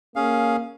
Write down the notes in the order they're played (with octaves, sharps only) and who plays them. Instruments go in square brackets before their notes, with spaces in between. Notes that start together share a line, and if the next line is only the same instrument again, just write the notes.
[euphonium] A#3 [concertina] C#4 G#4 F5